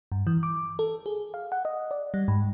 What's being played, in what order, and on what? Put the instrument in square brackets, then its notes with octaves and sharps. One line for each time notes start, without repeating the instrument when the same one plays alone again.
[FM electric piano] G2
E3
D6
A4
G#4
F5
F#5
D#5
D5
G3
G#2